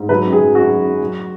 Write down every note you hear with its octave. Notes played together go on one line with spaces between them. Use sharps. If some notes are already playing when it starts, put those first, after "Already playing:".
Already playing: G#2
F#3 B4
F#2
G#4
F#3
F#2 F#4
F#3
F#2
F#3